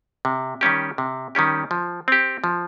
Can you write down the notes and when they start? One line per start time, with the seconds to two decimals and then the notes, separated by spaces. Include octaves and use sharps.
0.25 C3
0.61 D#3 G3 C#4 G4
0.98 C3
1.35 D#3 G3 C#4 G4
1.71 F3
2.08 C4 G4
2.44 F3